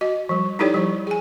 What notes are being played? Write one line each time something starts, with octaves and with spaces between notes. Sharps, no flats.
F#4 D#5
F3 G3
D#4 E4 G4 A4 C#5 D5
F3 G3
G#4 G#5